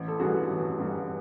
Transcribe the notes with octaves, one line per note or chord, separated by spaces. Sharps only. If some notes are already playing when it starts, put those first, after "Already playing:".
Already playing: A1
A4
G2 E3 G3 F#4 G#4
A1
G2 E3 G3